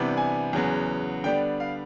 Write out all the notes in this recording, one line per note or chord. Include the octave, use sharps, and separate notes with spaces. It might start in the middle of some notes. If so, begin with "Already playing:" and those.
Already playing: C3 E3 G3 B3 D4
G#5
E2 C#3 F#3 B3
D3 G3 B3 D4 G5
F5